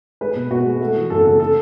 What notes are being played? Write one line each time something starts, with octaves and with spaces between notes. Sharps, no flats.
G#3 B4
B2
B2 F#4
G#3
A3
E3
F#2 A4
C#3 A4
A4